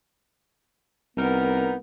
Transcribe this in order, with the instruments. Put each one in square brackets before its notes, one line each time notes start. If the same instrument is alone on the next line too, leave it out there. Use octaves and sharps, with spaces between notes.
[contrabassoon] C2 [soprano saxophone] B3 [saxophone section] D#4 A#4